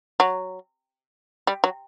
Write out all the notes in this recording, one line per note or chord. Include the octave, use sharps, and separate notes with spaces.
F#3
G3
F#3